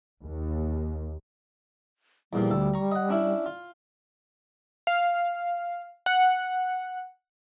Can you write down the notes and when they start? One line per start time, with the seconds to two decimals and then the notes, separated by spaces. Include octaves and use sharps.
0.23 D#2
2.33 E2 A#2 F3 G3
2.51 D2 A4
2.74 A#5 C#6
2.92 D#5 F#5
3.09 C#4 D4 E4
3.46 F4
4.87 F5
6.06 F#5